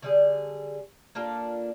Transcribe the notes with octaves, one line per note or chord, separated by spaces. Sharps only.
D3 G3 G#4
A#3 D4 F4 A4